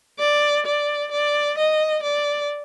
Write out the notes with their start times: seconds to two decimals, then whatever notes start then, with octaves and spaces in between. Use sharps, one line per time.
0.19 D5
0.66 D5
1.11 D5
1.58 D#5
2.03 D5